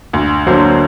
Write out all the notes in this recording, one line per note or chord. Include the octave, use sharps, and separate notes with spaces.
D2
D3 F#3 A#3 C5